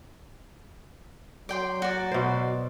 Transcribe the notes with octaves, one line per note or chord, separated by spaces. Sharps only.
F#3 D5 G5 C6
F#4 D5
B2 C5